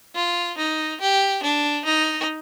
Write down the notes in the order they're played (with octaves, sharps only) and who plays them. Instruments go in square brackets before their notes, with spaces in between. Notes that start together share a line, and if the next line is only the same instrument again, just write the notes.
[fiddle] F4
D#4
G4
D4
D#4